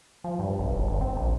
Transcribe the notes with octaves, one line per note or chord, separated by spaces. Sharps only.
F3
G2
B1
F#1
G1
C4
A#1